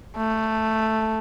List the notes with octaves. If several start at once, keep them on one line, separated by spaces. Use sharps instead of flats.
A3